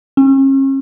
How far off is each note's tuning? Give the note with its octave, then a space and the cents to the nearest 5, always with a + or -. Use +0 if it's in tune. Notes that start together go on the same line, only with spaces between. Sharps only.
C#4 -40